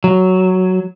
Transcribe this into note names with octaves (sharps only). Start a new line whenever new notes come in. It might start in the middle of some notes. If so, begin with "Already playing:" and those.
F#3